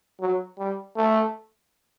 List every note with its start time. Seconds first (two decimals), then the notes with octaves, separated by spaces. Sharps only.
0.21 F#3
0.58 G3
0.96 A3